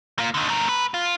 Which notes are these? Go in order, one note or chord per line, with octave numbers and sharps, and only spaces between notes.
A#3 F4
D3 D#3
A3 A#4
B4
F4